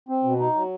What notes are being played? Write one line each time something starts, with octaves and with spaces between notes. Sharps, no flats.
C4
B2
D#4
F#3